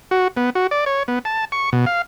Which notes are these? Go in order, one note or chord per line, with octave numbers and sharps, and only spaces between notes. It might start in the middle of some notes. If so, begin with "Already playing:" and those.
F#4
B3
F#4
D5
C#5
B3
A5
C#6
B2
F5